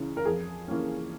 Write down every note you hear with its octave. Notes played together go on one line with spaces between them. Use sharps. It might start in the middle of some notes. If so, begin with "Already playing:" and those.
Already playing: C#2 C#3 E3
A#4
F2 G#4
E3 A#3 C#4